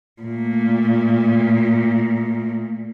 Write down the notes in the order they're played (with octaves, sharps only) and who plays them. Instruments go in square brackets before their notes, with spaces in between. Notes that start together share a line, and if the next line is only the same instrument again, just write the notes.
[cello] A#2 A3